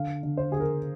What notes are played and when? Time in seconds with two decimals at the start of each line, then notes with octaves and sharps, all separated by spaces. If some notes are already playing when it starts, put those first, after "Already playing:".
Already playing: D3 F5
0.23 D3
0.37 C5
0.52 D3 G#4
0.60 A#4